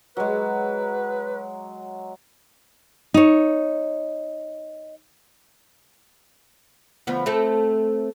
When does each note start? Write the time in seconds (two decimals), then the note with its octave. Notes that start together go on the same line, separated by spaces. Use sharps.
0.17 F#3 G#3 B4
3.14 D#4 C#5
7.07 D2 F3 B3
7.26 A3 C4 A4